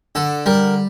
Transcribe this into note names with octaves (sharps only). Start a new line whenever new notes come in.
D3 A4
G3 A#4